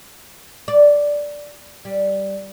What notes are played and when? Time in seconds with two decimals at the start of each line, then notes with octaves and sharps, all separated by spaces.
0.68 D5
1.85 G3